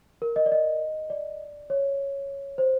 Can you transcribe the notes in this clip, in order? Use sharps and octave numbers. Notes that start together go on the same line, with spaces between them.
A#4
D#5
D5
D#5
D5
C#5
C5